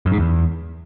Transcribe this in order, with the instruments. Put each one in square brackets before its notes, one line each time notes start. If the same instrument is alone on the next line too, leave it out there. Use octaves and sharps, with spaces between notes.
[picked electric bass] F#2
G#2
E2